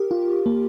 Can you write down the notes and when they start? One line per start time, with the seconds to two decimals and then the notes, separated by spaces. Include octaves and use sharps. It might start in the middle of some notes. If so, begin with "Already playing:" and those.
Already playing: G4 A#4
0.11 F4
0.46 A#3